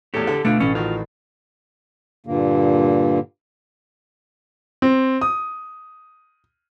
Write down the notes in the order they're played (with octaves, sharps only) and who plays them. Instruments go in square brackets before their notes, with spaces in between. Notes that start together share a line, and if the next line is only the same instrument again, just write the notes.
[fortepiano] E2 A2 [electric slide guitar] G4 A4
[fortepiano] D3
[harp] B2 [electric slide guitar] A3 D4 [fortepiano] F4
[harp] A1 A4 C7 [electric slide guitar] C#4
[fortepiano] D#3 F#4 [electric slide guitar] F4
[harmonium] G2 A#2 D3 A#3
[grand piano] C4
D#6